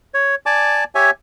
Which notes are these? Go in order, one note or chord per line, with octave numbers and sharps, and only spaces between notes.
C#5
D5 G#5 A5 D6
G4 C#5 E5 G#5